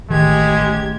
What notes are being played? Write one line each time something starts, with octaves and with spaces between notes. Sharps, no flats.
A1 D#3 G#3 G4 G#6